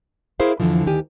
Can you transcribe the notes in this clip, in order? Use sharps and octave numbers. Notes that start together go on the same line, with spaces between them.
E4 G#4 A#4 C5 E5 F5
F2 B2 D3 E3 F3
D2 D#3 G4 G#5